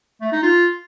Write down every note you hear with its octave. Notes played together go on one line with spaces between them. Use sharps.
A3
D#4
F4